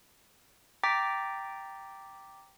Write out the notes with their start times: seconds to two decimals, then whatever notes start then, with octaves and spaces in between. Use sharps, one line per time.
0.83 G5 A#5 D6 A6 B6